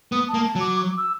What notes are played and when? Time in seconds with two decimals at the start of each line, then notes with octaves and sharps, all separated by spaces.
0.12 B3 D#6
0.29 A5
0.34 A#3
0.44 A5
0.55 F#3 D6
0.77 D6
0.97 E6